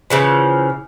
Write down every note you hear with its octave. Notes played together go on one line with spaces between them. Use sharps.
C#3 E3 F3